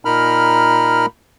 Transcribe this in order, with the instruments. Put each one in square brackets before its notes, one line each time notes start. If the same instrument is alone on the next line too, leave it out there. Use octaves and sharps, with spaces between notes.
[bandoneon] A#2 D#4 A#4 B5 F6